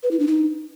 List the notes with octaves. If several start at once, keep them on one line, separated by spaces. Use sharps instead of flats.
B4
E4
D4
D#4